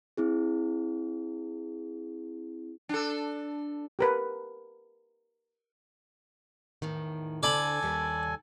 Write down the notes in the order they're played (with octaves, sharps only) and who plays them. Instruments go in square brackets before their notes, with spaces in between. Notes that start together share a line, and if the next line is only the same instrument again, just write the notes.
[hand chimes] C4 E4 G#4
[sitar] D4 A4
[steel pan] G4 A#4 B4
[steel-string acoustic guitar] E2 A2 D#3
[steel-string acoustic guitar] D2 D3 D4 [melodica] A4 G#5 [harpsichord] D5 B5
[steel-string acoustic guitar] D#2 G3